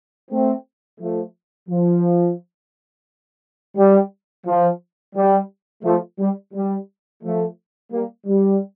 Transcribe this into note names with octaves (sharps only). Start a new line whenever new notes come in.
A3 C4
F3 A3
F3
G3
F3
G3
F3 A3
G3
G3
F3 A3
G3 A#3
G3